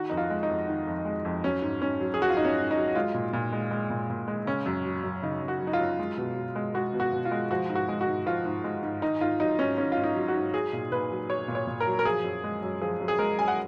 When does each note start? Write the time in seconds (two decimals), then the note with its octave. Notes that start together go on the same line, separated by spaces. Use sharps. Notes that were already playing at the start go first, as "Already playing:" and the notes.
Already playing: D#3 F#4
0.10 F2 D#4
0.17 F4
0.30 G#3
0.43 D#4
0.49 F2
0.68 D#3
0.87 F2
1.05 G#3
1.25 F2
1.44 F#3 C#4
1.62 G#2
1.81 G#2 C#4
2.00 F#3
2.14 G#4
2.20 F#3 F#4
2.30 F4
2.37 G#2 D#4
2.45 C#4
2.57 G#2
2.71 D#4
2.77 F#3
2.95 G#3 F4
3.14 A#2
3.33 A#2
3.53 G#3
3.71 G#3
3.90 A#2
4.10 A#2
4.28 G#3
4.46 C#3 C#4
4.66 F#2
4.85 F#3
5.04 F#2
5.23 C#3 D#4
5.42 F#2
5.48 F#4
5.61 F#3
5.67 D#4
5.73 F4
5.80 F#2
5.99 G#3
6.18 B2
6.36 B2
6.56 G#3
6.74 G#3 F#4
6.93 B2
7.00 F#4
7.13 B2
7.25 F4
7.31 G#3
7.51 F3 F#4
7.69 G#2
7.75 F#4
7.88 G#3
8.01 F#4
8.07 G#2
8.26 F3 F4
8.45 G#2
8.64 G#3
8.83 G#2
9.02 D#3 D#4
9.21 G#2 F4
9.40 F#3 D#4
9.59 G#2 C#4
9.78 D#3 C#4
9.92 F4
9.97 G#2
10.04 D#4
10.16 F#3
10.28 F#4
10.35 G#2
10.53 F#3 G#4
10.73 A#2
10.92 A#2 B4
11.11 F#3
11.30 F#3 C#5
11.48 A#2
11.55 C#5
11.67 A#2
11.80 A#4
11.87 F#3
11.99 A#4
12.05 F3 G#4
12.24 F#2
12.44 G#3
12.63 F#2
12.81 F3 G#4
13.00 F#2
13.08 G#4
13.19 G#3 A#4
13.38 F#2 G#5
13.48 F#5